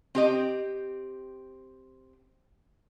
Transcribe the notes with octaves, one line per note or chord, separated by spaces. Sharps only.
C4 G4 D#5